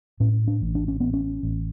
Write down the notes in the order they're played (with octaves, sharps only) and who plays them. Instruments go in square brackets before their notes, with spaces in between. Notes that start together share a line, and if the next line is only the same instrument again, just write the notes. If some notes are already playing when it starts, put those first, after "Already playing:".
[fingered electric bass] A2 C#4
D4
A1
D4
C#4
A1 B3
C#4
A1